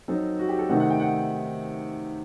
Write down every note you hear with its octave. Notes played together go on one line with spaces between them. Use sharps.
F#3 C4 D#4 A4
F#4
G4
A4
C3 D#3 A3 C4 D#4 F#5
F#5
G5
F#5